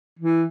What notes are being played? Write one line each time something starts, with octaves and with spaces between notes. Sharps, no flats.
E3